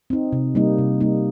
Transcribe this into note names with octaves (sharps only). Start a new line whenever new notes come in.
C4 D#4
C3
G3 A#3 D#4
C3
G3 A#3 D#4